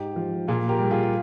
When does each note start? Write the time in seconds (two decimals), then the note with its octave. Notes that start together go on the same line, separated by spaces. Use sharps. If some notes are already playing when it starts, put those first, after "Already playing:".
Already playing: G#2 G4
0.16 F3
0.47 A#2 F4 G#4
0.69 G4 A#4
0.79 G3
0.91 F4 G#4
1.03 F4